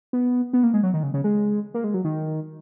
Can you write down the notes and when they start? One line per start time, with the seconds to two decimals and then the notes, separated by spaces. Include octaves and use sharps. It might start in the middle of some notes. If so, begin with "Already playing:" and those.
0.13 B3
0.53 B3
0.63 A#3
0.74 G#3
0.83 F#3
0.94 D#3
1.03 C#3
1.14 C#3
1.24 G#3
1.74 A#3
1.84 G#3
1.94 F#3
2.05 D#3